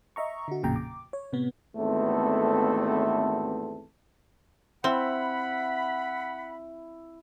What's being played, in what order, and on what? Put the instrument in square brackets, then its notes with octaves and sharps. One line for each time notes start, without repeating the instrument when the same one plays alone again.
[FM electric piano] D#5 E5 A#5 C#6
D3 F#4
A1 F2 A#2 C#3 G5 A#5
D6
C#5
A2 C3 B3
[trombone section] G#1 E2 A3 B3 C4 A4
[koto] C4 [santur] E4 [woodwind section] F#5 B5